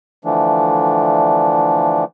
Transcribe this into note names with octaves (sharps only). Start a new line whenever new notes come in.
D3 E3 F3 A3 D4